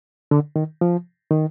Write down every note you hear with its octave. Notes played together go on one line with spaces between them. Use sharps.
D3
D#3
F3
D#3